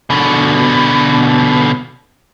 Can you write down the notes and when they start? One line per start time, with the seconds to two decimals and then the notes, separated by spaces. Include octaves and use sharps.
0.10 B2 D3